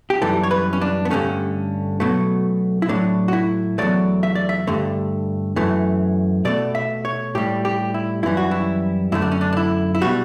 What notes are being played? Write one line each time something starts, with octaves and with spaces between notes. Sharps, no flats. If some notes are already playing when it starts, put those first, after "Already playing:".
G4
F#2 E3 G3 A4
C#5
B4
C#4
D4
B3
G2 D3 A3 C#4
B2 F#3 A3
E4
A2 F#3 A3 D4
F#4
E4
E2 B2 F#3 A3 D5
E5
D5
E5
G2 D3 A3
F#2 E3 A3
B2 A3 D5
E5
C#5
A2 G3 G4
G4
E4
F#2 E3 G3 E4
F#4
E4
F#2 D3 A3 E4
D4
C#4
D4
D4
E4
E4
B2 G3 F#4